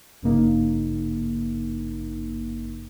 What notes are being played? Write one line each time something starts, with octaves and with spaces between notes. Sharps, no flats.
G#1 G2 C#3 A#3 D#4